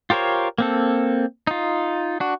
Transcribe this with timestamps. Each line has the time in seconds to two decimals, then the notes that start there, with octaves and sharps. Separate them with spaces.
0.10 F4 G4 A#4 C5 C#5
0.58 A#3 C4 A4
1.47 D#4 F4
2.20 D4 F#4